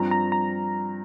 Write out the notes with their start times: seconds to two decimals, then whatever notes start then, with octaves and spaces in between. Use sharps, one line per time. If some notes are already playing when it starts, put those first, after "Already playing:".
Already playing: G2 F3 C4 A#5
0.11 A#5
0.32 A#5